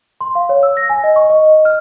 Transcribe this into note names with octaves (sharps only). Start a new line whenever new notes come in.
C6
F5
C#5
E6
A#6
G#5
D#5
C#6
D#5
D#5
F6